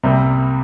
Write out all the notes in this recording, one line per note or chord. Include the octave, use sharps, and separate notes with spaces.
C2 C3 G3 A#3